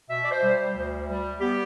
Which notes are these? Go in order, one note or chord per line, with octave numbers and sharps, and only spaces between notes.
B2 E5
D5
C5
G3
D2
G3
B3 G4